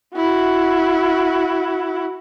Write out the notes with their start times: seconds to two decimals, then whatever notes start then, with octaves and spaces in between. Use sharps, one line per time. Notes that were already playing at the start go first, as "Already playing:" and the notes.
0.16 E4 F#4